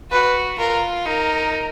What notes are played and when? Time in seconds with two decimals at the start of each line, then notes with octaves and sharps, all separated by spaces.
0.11 F#4 B4
0.59 F4 A#4
1.06 D#4 A#4